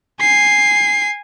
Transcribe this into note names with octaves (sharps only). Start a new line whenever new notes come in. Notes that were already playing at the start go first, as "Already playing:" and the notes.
G#5 C7